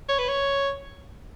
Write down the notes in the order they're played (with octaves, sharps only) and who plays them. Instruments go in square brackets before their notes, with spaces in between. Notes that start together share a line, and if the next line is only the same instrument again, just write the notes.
[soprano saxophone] C#5
B4
C#5